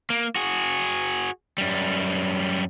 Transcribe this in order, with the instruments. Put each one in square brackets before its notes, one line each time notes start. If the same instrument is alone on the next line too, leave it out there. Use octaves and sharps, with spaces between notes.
[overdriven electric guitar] A#3
F#4 G#4
F#2 G3